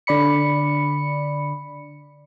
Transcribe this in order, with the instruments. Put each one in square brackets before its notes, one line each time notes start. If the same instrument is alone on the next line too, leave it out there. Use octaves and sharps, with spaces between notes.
[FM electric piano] D3 D5 B5 C#7